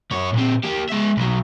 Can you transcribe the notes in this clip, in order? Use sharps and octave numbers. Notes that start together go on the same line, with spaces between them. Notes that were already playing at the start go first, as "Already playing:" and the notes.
F#2 C#5
A#2 C4
A#3 G4
G#3 E5
B1 F#3